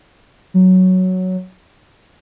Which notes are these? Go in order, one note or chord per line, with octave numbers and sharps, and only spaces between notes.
F#3